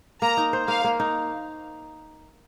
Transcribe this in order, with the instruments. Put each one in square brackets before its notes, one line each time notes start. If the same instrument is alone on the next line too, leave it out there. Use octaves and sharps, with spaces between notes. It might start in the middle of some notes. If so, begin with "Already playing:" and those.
[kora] A#3 [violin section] A#5
[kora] D#4
C5
[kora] A#3 [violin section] F5
[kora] A#3
D#4